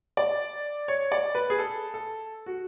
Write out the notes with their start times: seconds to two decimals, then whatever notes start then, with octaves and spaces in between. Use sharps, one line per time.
0.17 D5
0.88 C#5
1.12 D5
1.35 B4
1.50 G#4
1.58 A4
1.94 A4
2.46 F#4